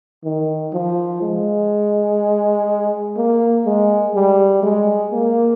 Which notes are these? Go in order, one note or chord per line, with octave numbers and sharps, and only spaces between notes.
D#3
F3
G#3
A#3
G#3
G3
G#3
A#3